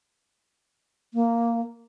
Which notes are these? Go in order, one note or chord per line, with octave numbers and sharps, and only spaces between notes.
A#3